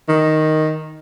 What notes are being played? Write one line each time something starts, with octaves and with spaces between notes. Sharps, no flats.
D#3